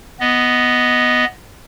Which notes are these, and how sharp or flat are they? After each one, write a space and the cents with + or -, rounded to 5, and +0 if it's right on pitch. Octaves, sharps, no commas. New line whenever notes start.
B3 +0 D#5 +0